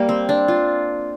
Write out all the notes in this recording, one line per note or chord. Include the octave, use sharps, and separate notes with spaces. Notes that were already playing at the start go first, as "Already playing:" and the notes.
Already playing: G3 A#3
C4
D4
F4